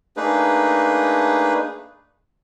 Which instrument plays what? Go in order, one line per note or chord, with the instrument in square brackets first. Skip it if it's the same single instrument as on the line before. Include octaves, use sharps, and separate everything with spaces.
[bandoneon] A3 A#3 D4 D#4 G#4 B4